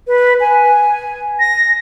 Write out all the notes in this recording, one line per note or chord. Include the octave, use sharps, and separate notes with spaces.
B4
G#5
A#6